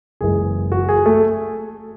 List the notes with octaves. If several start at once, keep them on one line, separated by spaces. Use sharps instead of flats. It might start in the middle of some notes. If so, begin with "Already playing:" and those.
F#1 F#2 E3 G#3 G#4
F#4
G#4
A3 A4